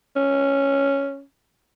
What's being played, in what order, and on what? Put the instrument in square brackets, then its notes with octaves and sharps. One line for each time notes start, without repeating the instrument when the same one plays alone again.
[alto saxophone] C#4